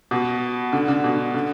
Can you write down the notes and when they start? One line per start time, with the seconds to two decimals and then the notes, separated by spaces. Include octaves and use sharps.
0.11 B2
0.73 D3
0.88 D3
1.04 B2
1.35 D3